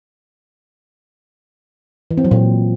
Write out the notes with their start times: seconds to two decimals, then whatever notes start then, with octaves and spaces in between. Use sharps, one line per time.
2.11 E3
2.17 C4
2.24 F#3
2.31 A#2